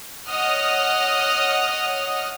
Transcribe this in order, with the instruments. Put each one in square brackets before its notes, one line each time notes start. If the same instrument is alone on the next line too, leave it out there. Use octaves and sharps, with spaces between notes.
[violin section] C#5 D#5 F#5 D#6 F6